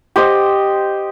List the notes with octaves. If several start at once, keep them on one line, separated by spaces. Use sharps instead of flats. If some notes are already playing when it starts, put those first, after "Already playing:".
G4 C5 D#5